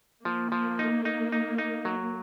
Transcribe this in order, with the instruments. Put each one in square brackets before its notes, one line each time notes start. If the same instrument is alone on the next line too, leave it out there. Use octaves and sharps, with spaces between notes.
[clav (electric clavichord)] F3 [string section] A#3
[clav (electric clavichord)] F3
D#4
D#4
D#4
D#4
F#3